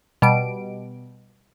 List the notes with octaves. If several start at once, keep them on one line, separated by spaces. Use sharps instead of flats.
B2 G3 D7